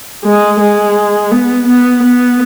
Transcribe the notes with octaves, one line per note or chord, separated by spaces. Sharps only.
G#3
G#3
B3
B3
B3